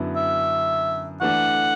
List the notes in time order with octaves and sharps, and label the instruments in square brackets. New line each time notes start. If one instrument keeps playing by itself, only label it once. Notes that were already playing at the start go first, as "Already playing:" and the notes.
Already playing: [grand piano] F#2 D3 B3 E4 B4
[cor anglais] E5
[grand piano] E3 A3 D4 [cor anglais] F#5